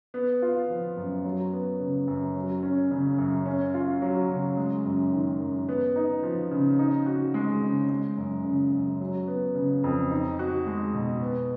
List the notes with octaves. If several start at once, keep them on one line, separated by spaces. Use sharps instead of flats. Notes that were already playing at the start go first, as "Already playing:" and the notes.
B3
F4
F3
F#2
F#3
B3
C#3
F#2
F#3
C#4
C#3
F#2
C#4
F4
F#3
C#3
G#3
F#2
D#3
F#2
B3
D#4
F3
C#3
D#4
F#4
G#3
C#3
G#3
F#2
C#3
F#2
F#3
B3
C#3
F2
D#4
F#4
G#3
B2
B3